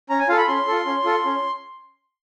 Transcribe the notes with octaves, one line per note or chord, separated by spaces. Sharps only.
C#4 A#5
G#5
F4 A4 F5
B5
C#4 C6
F4 A4
C#4
F4 A4
C#4